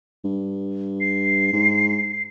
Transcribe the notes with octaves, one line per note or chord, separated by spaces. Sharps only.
G2
C7
G#2